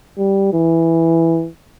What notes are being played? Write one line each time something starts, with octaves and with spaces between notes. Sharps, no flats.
G3
E3